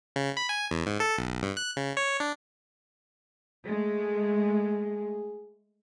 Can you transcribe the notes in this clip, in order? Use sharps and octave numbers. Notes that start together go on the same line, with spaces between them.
C#3
B5
G#5
E2
G#2
A4
B1
G2
F#6
C#3
C#5
D4
G#3 A3 G#4